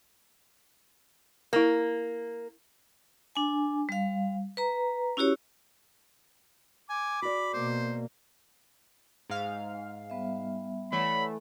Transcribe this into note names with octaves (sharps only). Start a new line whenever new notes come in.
A#3 E4 A#4
D4 G#5
G3 F5
B4 A#5
C#4 E4 F#4 G4 C#5
G#5 D6
F#4 G#4 D5 B5
B2 A#3 C5
G#2 F5
G3 B3 E5
E3 A3 C#5 D5 F#5 B5